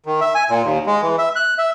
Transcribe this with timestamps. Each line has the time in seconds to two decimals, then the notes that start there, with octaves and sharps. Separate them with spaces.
0.06 D#3
0.21 E5
0.35 G#5
0.50 A#2
0.63 D#2
0.87 G#3
1.02 E3
1.18 E5
1.36 F#6
1.58 E5